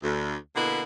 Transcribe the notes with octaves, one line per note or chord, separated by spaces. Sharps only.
D2
B2 D3 A#3 E4